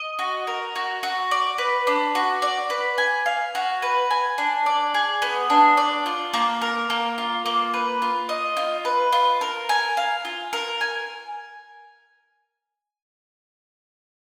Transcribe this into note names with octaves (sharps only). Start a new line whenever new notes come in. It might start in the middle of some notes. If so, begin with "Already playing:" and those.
Already playing: D#5
F#4
A#4
F#4
F#4
D5
B4
D4
F#4
D5
B4
G#5
F5
F#4
B4
G#5
D4
D5
G#4
B3
D4
D5
F4
A#3
A#4
A#3
F4
A#3
B4
F4
D#5
F4
B4
F4
A#4
G#5
F5
F4
A#4
G#5